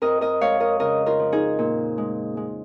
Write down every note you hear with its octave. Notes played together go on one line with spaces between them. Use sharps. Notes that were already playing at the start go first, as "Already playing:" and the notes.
F2 A#4 D#5
A#4 D#5
G#3 C#5 F5
A#4 D#5
C#3 A#4 D#5
F4 A#4
F3
D#4 G#4
A#2
G#3
G#3